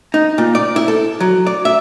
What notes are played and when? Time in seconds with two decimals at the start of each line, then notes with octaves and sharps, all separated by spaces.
0.14 D#4
0.38 A#2
0.55 D5
0.76 E4
0.88 A4
1.20 F#3
1.46 D5
1.65 E5